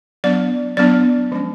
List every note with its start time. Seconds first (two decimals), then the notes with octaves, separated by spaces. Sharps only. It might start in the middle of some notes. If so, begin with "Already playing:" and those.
0.24 F#3 B3 D4 D5
0.77 F#3 B3 D4 D5
1.32 F3 G#3 C#4